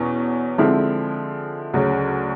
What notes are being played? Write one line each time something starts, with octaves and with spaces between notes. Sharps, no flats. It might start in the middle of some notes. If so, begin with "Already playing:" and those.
Already playing: E2 B2 C#4
D3 F3 G#3 C4 E4
D2 C#3 F#3